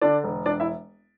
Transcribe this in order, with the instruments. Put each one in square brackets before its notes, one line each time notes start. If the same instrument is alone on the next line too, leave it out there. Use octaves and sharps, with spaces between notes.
[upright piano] D3 D4 D5
E1
E1 D4 D5
E4 E5